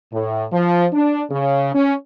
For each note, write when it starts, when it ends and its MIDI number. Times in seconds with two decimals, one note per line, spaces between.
0.13 0.45 45
0.52 0.86 53
0.93 1.22 62
1.30 1.73 49
1.75 1.94 61